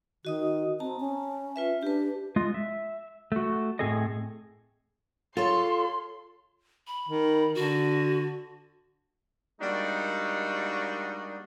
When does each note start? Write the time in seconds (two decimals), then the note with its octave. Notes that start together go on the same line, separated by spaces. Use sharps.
0.25 D#3 F#4 D#5 D#6
0.80 C4 A5 A#5
1.00 C#4
1.56 F4 B4 E5
1.83 D4 G4 B4
2.36 G#3 F4 D#5
2.54 E5
3.32 A3 F#4
3.79 A2 C4 G#4 A4 D#5
5.37 F4 A4 C#5 C6
6.87 B5
7.09 D#3
7.55 D3 F#4
9.61 G3 G#3 A#3 D4 D#4 F#4